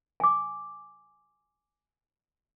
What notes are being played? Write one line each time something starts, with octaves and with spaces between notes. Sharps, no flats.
G#5 D6